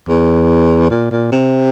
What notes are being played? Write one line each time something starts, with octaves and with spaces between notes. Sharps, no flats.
E2
A#2
A#2
C3